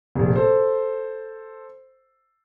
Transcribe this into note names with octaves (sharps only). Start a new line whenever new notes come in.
F1 A#1
A4 C5